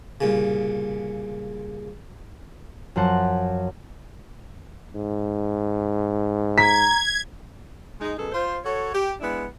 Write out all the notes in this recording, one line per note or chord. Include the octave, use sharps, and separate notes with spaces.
C2 A#2 C#3
F#2 F3 C5 F#5 A5
G#2
A#5 G#6 B6
G#3 D#4
F#2 B2 G#4 A4
F4 C5
F#4 A4 C#5
G4
G#3 B3 D4 E4